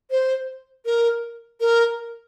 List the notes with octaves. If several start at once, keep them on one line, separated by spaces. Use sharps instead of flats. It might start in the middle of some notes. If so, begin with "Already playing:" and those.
C5
A#4
A#4